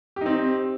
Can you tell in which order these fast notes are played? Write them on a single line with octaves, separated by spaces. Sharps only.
G4 D#4 C4